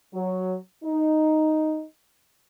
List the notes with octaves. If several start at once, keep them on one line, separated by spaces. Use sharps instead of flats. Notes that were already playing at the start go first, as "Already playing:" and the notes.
F#3
D#4